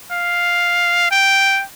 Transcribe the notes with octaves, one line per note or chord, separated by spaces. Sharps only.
F5
G5